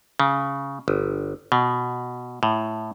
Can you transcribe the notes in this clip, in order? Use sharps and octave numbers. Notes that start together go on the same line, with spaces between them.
C#3
G1
B2
A2